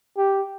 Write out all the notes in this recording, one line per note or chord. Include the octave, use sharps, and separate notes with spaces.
G4